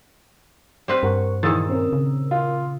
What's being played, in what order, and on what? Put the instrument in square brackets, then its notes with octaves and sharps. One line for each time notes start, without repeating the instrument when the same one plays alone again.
[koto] G3 C4 B4
[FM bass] G2 [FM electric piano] A#4 F#5 C#6
[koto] A#2 D#3 [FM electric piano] E3 G#4 [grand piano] D#6 E6 A6
[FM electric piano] C4 C#4 A#4
[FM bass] C#3
[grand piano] F4